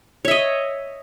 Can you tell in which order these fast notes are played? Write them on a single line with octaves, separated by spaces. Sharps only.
C#5 E5 D#5